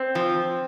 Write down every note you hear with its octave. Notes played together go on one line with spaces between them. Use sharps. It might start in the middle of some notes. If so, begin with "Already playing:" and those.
Already playing: C4
F3